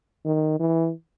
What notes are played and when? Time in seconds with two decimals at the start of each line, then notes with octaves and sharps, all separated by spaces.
0.25 D#3
0.60 E3